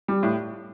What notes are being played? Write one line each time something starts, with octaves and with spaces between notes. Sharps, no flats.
G3
A2